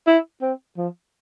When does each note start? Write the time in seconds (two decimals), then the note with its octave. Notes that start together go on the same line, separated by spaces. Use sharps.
0.07 E4
0.42 C4
0.77 F3